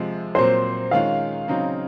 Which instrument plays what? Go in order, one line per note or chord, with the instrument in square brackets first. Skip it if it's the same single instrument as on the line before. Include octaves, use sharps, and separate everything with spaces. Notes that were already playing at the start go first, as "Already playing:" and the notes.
Already playing: [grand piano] C3 F3 G#3
[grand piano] A#2 F#3 C4 [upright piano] C5
[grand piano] D#3 G#3 C#4 F4 [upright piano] F5
[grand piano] C#3 F#3 C4 D#4